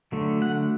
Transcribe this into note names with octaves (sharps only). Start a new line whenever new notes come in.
D3 F#3 A3
F#5